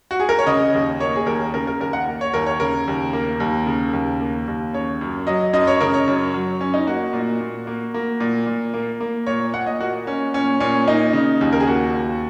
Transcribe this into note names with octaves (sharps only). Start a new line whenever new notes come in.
F#4
G#4
A#4
C#5
C#3 D#5
D#2
A#3 C#5
G#4
D#2 A#4
C#3 A#4
A#4
D#2 A#4
F#5
A#3
C#5
D#2 A#4
C#5
C#3 A#4
D#2
A#3
D#2
C#3
D#2
A#3
D#2
C#3 C#5
F#2
F#3 D#5
F#2 D#5
C#5
C#3 A#4
C#5
F#2
F#3
F#2 C#4
D#4
A#3 F#4
A#2
A#2
A#3
A#3
A#2
A#2
A#3
A#3
A#2 C#5
A#2 F#5
D#5
A#3 F#4
A#3 C#4
A#2 C#4
A#2 C#4
A#3 D#4
C#3
D#2
A#4
G#4
A#3 F#4
D#2